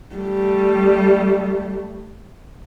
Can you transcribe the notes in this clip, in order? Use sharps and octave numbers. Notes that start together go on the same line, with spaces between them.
G3 A3